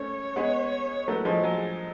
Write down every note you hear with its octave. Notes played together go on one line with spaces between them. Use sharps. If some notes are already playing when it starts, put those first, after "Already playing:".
Already playing: A3 C#4 C#5
G#3 B3
F#3 A3 B4
F3 G#3 C#5
F#3 G#4